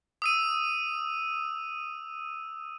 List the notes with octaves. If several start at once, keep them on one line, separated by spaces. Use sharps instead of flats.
D#6 E6 D#7